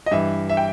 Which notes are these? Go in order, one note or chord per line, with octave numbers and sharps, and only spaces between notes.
D#5
G2 E3 E5
E5
G5